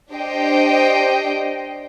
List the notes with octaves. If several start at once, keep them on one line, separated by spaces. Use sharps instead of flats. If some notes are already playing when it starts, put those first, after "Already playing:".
D4 G4 C5 D#5 G5